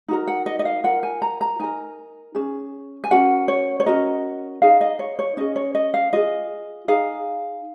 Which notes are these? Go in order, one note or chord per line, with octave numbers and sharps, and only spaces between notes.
D#4 F#4 A#4
F#5
D#5
D#5
F5
F4 A#4 F#5
G#5
A#5
A#5
D#4 A#4 G#5
C#4 G#4
G#5
C#4 F#4 A#4 F#5
C#5
C#5
C#4 F#4 A#4 D#5
D#4 G#4 F5
D#5
C#5
C#5
C#4 G#4 D#5
C#5
D#5
F5
F4 G#4 D#5
D#4 G#4 F5